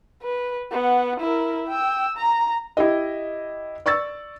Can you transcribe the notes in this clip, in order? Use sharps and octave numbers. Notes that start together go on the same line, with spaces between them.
B4
B3 F#5
E4 A#4
G5 E6
A#5
E4 G4 D#5
D5 C#6 E6 A6